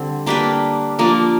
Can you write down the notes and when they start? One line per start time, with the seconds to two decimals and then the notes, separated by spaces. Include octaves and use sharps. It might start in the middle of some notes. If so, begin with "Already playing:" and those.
Already playing: D3 G3 C4
0.26 A#3 D4 G4 B4
0.99 F3 A#3 D4